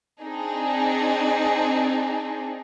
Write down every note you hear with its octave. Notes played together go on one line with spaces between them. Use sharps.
C4 D4 D#4 G#4